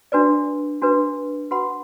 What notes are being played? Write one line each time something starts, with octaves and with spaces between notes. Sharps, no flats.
D4 F#4 B4 D5
D4 F#4 B4
F#4 B4 F#5 B5